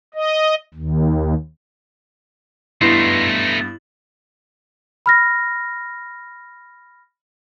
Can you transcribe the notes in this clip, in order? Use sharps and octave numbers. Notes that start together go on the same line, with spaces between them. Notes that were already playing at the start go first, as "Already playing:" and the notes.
D#5
D#2
G2 A3 B3 D#4 E4 C6
B5 F6 A#6